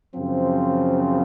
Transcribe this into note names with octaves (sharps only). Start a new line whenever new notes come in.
F#2 C#3 F3 C4